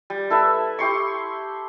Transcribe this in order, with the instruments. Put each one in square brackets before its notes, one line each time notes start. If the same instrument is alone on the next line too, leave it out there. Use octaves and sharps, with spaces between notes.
[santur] G3
E4 A4 B4 E5
E4 G4 C6 C#6